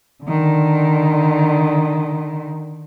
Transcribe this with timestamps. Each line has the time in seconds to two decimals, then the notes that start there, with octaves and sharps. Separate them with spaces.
0.24 D3 D#3